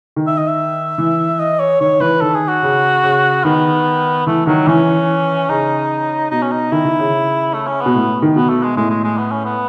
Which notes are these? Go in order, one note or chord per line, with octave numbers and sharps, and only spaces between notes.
D#3
E5
D#5
E5
E3
D#5
C#5
D#3 C#5
E3 B4
D#3 A4
G#4
F#4
C#3
C#3
D#3 B3
E3 A3
D#3 F#3
E3 C#4
C#3 D#4
B2 D#4
C#4
D#4
D#3 E4
D#3
C#3
A3
C#4
B2 B3
A2
D#3
B2 B3
A3
G#3
A2 G#3
G#3
G#3
B3
C#4
B3